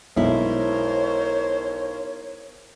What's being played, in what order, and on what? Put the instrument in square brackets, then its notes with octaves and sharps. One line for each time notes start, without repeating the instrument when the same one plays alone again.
[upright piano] B1 [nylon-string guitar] G#3 B3 E4 [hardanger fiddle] A#4 C5 [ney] C#5